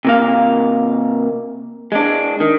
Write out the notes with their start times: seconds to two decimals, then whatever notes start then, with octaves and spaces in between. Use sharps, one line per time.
0.05 C3 A#3 F5
1.92 G#3 D4
2.40 D#3